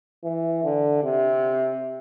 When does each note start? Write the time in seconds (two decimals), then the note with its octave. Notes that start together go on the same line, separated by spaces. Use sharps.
0.24 E3
0.64 D3
1.03 C3